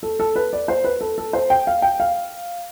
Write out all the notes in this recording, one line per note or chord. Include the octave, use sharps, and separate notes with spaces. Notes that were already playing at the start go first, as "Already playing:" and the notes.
A4
A4
B4
D5
C5
B4
A4
A4
C5
G5
F5
G5
F5